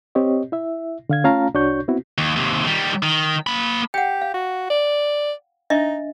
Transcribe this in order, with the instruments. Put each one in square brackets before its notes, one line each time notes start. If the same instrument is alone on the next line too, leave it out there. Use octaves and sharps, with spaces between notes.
[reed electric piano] C4 G4 C#5 D#5
E4 E5
D3 F5 G#6
A3 C#4 F4 F5 A5 A#5
C2 D4 F#4 C#5 C#6 G6
B3 C4 E4 F#4
[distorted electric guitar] D#2
D#2 C3
D#3 G3
D#3
A#3 B5
[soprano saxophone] G4 [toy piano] F#5 G5
[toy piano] F5
[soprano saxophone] F#4
D5
[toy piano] D4 D#5 E5 [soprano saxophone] D#4